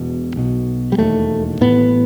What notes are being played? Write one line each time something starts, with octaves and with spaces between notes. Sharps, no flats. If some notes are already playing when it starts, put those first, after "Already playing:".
Already playing: E1 E2 B2
B1 B2
G3
E1 D#2 A3
A1 A2 B3